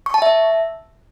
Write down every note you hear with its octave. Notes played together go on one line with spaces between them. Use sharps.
C#6
A5
E5